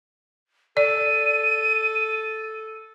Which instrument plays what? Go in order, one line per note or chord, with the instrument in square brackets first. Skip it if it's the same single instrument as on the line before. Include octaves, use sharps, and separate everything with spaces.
[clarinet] A4 [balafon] D5 [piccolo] D#7